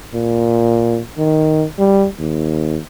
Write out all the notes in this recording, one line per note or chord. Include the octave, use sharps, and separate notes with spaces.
A#2
D#3
G3
D#2